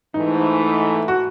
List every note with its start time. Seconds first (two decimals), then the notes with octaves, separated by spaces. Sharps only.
0.14 G#2 E3 A3 D#4
1.08 F#4